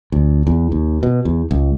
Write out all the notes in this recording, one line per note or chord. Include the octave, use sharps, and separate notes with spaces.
D2
E2
D#2
B2
E2
C#2